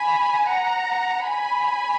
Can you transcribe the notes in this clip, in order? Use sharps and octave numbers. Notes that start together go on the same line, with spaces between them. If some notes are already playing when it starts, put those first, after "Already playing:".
Already playing: G#5 B5
F#5 A#5
G#5 B5